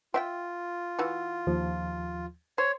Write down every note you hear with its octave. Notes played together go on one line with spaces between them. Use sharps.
C4 F4 E5 G5
E3 F#4
D#2 F3
C5 C#5